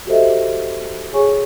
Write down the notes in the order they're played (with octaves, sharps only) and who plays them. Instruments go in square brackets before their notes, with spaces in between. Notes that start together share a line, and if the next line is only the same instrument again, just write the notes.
[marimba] F#4 G4 A4 C5 D#5 E5
G#4 C#5 G#5 C#6